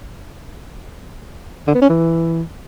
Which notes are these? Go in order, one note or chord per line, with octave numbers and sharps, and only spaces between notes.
D3
B3
C#4
E3